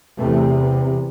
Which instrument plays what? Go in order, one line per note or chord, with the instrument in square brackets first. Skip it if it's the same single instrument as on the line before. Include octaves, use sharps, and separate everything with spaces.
[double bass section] E2 C3 A3